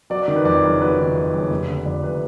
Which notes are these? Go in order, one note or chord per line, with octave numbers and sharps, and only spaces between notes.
F#3 D5
D5
D#3
B4
F2 D5
F#1
F#3 B4
D#3
F2
F#1
F1
D3
F2 D5
F1 B4